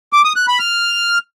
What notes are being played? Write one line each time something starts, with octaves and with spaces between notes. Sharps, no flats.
D6
D#6
F#6
B5
F6